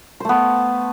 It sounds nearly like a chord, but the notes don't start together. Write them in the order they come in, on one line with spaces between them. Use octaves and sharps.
C5 A3 B3